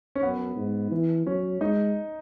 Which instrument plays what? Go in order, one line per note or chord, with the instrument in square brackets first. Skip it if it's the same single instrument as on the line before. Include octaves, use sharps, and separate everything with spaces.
[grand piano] C#4
[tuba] F#2 [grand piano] B3
[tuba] G#2
E3
[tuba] F#3 [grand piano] C#4
[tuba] G#3 [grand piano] D#4